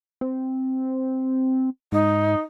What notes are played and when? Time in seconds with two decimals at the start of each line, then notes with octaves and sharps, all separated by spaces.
0.21 C4
1.92 G#2 D#4